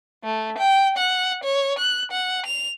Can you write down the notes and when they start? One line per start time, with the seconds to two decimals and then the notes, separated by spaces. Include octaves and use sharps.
0.24 A3
0.59 G5
0.97 F#5
1.44 C#5
1.79 F#6
2.12 F#5
2.46 F7